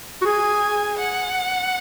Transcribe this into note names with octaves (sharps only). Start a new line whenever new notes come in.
F#4
G#4 G#5
F#5